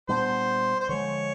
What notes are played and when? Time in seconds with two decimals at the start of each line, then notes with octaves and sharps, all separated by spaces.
0.09 A#2 G3 B3 D4 C5
0.80 C5
0.89 D3 F3 G#3 C#5